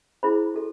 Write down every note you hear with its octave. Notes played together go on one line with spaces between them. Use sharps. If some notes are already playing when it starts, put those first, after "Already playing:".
E4 G#4 C5 B5
F#4 A4